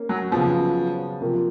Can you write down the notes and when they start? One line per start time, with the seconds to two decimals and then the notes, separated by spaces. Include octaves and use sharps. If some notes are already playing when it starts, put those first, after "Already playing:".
Already playing: A#3 C#4
0.09 F#3
0.31 C#3 F3 F#3 B3
1.21 C3 F3 A#3